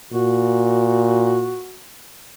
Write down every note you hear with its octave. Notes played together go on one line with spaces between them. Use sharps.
A#2 F#4